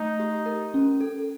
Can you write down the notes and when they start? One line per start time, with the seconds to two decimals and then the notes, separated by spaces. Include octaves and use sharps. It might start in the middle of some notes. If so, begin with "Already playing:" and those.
Already playing: A3 D#4
0.20 G4
0.46 A#4
0.74 C#4
1.01 A4